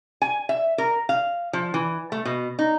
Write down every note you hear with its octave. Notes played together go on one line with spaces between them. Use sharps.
G#5
E5
A#4
F5
F3
E3
A3
B2
D#4